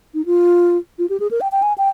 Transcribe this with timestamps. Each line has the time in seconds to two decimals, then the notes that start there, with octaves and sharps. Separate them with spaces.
0.14 D#4
0.26 F4
0.99 F4
1.10 G4
1.20 G#4
1.31 A#4
1.41 G5
1.52 G5
1.62 G#5
1.78 G5